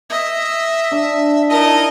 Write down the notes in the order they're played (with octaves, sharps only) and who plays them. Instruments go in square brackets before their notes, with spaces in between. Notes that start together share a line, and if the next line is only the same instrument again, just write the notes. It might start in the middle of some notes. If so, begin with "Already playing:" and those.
[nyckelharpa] D#5 [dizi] E5
[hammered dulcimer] D4
[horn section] D#4 E4 D#5 [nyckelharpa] A#4 [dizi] A5